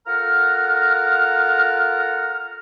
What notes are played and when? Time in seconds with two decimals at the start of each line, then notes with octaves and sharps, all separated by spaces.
0.07 F4 A4 A#4 F#5 A#5 F6